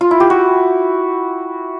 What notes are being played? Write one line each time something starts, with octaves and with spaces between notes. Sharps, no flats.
F4
E4
G4
F#4